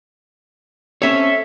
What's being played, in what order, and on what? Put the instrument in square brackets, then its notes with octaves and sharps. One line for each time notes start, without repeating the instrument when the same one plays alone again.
[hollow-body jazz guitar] C4 C#4 C#5 [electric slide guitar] A4 E5